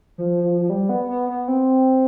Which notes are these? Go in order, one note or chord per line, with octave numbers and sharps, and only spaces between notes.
F3
F3
F3
G3
B3
B3
B3
C4